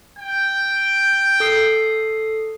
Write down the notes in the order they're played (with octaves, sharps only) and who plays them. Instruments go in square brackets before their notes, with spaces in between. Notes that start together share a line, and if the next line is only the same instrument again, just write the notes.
[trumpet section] G5
[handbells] A4 D#6 C7